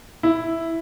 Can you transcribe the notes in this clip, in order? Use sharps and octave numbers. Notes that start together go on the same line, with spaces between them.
E4